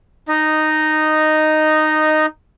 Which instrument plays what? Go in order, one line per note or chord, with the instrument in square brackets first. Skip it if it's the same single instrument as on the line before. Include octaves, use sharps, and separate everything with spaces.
[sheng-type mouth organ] D#4 D#5